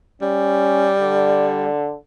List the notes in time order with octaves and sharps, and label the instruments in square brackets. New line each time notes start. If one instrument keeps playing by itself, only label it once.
[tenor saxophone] G3 [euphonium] C#4
[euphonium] D3